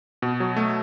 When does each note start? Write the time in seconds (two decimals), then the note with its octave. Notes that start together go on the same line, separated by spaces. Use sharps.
0.22 B2
0.40 F#3
0.56 A3